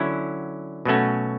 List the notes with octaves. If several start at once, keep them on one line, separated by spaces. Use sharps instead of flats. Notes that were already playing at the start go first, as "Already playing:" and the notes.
Already playing: D3 F#3 C#4 E4
B2 F#3 A3 C#4 F#4